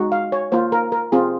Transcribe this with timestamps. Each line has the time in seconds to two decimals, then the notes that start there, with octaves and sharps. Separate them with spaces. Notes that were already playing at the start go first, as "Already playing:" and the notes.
Already playing: G#3 D#4 F#4
0.12 F5
0.32 C#5
0.52 A#3 F4 C5
0.72 A#4
0.92 A#4
1.12 C4 F4 G#4